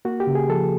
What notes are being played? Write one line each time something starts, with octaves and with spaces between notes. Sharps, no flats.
A#3 F#4
G4
C#3
G#4
F3 A4